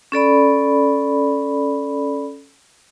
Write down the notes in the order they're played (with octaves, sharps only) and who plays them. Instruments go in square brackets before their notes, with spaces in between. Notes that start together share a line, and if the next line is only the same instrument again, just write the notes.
[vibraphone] C#4 A4 D5 B5